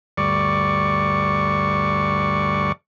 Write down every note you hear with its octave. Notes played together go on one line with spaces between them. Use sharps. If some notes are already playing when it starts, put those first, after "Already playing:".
D2 G2 D5 C#6